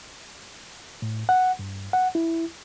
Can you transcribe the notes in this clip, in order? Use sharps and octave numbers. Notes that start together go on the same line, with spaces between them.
A2
F#5
G2
F#5
E4